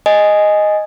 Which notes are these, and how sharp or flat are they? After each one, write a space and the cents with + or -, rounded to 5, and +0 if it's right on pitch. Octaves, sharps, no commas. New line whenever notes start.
D#5 +0 G#5 +0